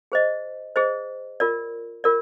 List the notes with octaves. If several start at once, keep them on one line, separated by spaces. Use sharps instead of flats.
G#4 C5 D#5
G#4 C5 D#5
F4 A#4 D5
F4 A#4 D5